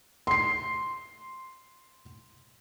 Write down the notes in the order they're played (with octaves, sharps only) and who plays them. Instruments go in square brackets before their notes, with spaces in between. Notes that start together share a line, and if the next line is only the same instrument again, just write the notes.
[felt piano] C6 C7